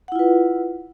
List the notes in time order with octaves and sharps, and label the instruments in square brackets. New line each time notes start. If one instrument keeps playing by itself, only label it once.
[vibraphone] F#5
E4
F4
B4